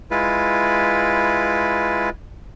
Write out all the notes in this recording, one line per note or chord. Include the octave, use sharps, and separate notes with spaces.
G#3 E4 F4 B4